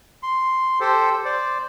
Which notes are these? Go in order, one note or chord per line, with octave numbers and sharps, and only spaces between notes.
C6
G4 A4 C5
C5 D5